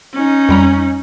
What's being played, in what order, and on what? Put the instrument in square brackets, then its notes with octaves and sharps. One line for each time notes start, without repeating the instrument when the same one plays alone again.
[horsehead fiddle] C#4 D#4
[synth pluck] F2 G3 A#5